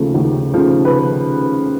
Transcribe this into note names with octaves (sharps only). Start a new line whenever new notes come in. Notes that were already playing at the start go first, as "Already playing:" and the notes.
Already playing: D#2 C#3 F3 A3
D#2
C#3 F3 A3
B4